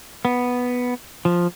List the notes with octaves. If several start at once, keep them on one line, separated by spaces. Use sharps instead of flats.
B3
F3